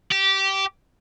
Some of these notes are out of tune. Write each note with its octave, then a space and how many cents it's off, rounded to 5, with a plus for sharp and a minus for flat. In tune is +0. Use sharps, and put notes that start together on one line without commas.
G4 -15